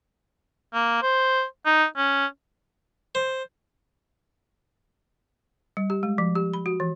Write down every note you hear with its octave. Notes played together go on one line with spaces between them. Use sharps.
A#3
C5
D#4
C#4
C5
G3
G4
G#3
F3
G4
B5
F#4
E3